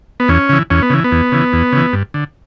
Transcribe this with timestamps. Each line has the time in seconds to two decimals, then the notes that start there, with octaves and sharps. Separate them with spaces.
0.20 B3
0.28 E2 C#4
0.49 C#3 E3
0.70 E2 C#4
0.82 B3
0.90 C#3 E3
1.04 B3
1.12 E2
1.32 C#3 E3
1.53 E2
1.72 C#3 E3
1.93 G2
2.14 D3